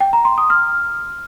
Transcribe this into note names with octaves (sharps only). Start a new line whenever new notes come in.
G5
A#5
C6
D#6
F6